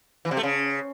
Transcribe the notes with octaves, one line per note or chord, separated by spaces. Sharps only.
E3
C3
A3
C#3